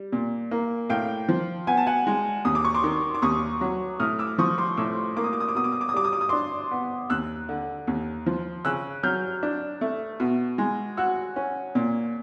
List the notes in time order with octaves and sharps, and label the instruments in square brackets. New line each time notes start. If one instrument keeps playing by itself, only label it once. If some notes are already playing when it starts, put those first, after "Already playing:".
Already playing: [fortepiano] G3
A#2
A#3
[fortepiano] A2 [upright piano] F5 G5
[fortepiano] F3
[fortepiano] B3 [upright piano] G#5
[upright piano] A5
F#5 G#5
[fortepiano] G#3
[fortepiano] D#2 [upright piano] D#6
[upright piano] D6
C#6
C6 D6
[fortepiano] D#3
[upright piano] D6
[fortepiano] D#2 [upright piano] C#6 D#6
[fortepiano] F#3
[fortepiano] A2 [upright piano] D#6 F6
[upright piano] D6 E6
[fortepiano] F3 [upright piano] C#6 D#6
[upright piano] C6 D6
[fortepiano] A2 [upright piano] D6 E6
[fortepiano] A#3 [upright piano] D6
[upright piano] D#6
D6
D#6
D6
[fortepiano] B2 [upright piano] D#6
[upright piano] D6
D#6
D6
D#6
[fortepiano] G3 [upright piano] D6
[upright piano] D#6
D6
D#6
[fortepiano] D4 [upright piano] C6 D6
[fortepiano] B3
[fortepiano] D#2 [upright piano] E6 F#6
[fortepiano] D3
D#2
F3
[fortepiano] C#3 [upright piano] E6 F#6
[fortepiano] F#3 [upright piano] F6 G6
[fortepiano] D4
A3
B2
G#3
[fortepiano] F#4 [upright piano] E6 F#6
[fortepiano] C#4
A#2